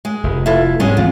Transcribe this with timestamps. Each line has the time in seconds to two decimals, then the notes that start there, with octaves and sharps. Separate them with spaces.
0.05 G#3
0.24 F1
0.46 E4 F4 A4
0.80 G#2 G3 G#3 C4 C#4
0.97 D2 E3 C4 F4